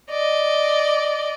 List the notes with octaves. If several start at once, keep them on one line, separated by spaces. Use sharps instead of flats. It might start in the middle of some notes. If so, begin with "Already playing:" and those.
D5 D#5